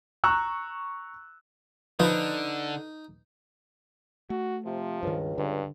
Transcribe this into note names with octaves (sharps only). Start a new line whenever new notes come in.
A#5 C#6 E6 F#6
D3 F3 D#4 B4
A3 F#4
C3 F3
C#2 G2 D#3
G2 D3